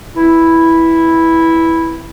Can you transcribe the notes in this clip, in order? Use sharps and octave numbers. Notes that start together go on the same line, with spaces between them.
E3 C4 E4